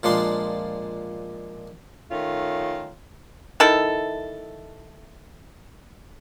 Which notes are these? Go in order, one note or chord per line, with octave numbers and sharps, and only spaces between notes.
A#2 F3 G#3 D4 C6
D#3 A3 C#4 F4
D#3 E4 A4